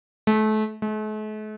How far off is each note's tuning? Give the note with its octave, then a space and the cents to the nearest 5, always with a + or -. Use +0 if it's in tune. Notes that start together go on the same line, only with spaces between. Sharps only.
A3 -30
A3 -45